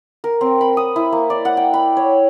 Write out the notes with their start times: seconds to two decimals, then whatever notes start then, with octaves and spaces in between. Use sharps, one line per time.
0.24 A#4
0.41 C4
0.61 B5
0.77 D#6
0.96 E4
1.12 A#3
1.30 D5
1.45 F#5
1.57 G5
1.74 B5
1.97 C#5